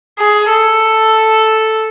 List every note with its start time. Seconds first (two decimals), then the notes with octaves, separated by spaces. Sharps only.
0.19 G#4
0.49 A4